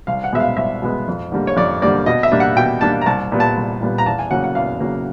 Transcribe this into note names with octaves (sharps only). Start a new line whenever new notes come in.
C2 F5
F#5
B2 G#3 B3 E5
F5
C2 E5
B2 G#3 B3
F2
D3 G3 A#3
C#5
F2 D5
D3 G3 A#3 D5
B2 D#5
E5
G3 A#3 D4
F#5
B2 G5
G3 A#3 D4 A5
A#5
C2 A5
A#2 G3 B3
A5
C2
A#2 G3 B3
A#5
E2 A5
G#5
C#3 F#3 A#3 F#5
F#5
E2 F5
C#3 F#3 A#3